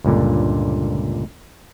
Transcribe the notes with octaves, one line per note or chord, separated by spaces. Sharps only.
C#2 G2 A#2 D3